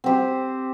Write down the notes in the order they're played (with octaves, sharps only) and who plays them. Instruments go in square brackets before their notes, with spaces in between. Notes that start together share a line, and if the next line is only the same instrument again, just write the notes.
[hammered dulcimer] C4 G4 C5